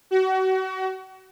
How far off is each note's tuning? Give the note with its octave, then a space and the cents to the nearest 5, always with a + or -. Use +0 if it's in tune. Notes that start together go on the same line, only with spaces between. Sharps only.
F#4 +35